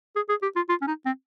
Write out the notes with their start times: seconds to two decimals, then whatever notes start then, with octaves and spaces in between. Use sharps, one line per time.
0.16 G#4
0.29 G#4
0.42 G4
0.56 F4
0.69 F4
0.81 C#4
0.87 D#4
1.05 C4